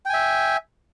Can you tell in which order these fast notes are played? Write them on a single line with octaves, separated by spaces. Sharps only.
G5 G#5 E5